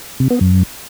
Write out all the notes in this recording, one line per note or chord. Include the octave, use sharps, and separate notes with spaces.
C3
B3
F#2